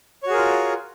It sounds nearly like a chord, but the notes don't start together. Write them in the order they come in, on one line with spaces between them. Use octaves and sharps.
C#5 F#4 G#4 A#4 F4